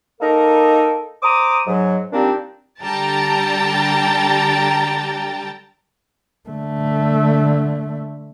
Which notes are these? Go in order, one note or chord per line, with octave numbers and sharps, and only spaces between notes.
A#3 D#4 A4 A#4
C5 A#5 D6 D#6
G#2 F#3
A#2 G3 A#3 C4 D4 D#4
D3 G3 G5 A5 A#5 A6
D3 A3